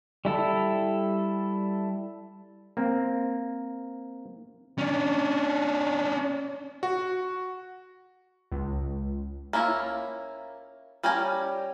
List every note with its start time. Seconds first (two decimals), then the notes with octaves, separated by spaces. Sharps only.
0.25 G3 E4 A4
2.77 A#3 C4
4.78 C#4 D4
6.83 F#4
8.52 C#2
9.53 A#3 C#4 E4 F4
11.03 G3 C#4 G4 A#4 G#5